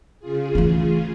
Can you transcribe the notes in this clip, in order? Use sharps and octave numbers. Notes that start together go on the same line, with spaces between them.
C#3 F4 G#4
E3 A3